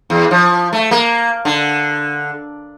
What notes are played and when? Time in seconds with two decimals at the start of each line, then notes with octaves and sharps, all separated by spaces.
0.10 E2
0.31 F3
0.73 A3
0.91 A#3
1.45 D3